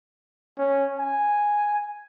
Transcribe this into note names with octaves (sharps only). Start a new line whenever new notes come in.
C#4
G#5